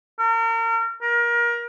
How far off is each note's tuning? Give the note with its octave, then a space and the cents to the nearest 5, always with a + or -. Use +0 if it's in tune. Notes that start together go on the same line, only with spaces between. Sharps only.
A#4 -35
A#4 +25